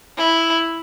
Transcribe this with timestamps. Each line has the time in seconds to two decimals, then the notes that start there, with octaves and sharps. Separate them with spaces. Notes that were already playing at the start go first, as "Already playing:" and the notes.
0.17 E4